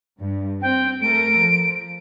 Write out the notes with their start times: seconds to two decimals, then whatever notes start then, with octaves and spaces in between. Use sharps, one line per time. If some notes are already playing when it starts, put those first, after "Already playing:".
0.19 G2
0.62 C4 G5
1.02 A3 A4 A#4 D7
1.38 F3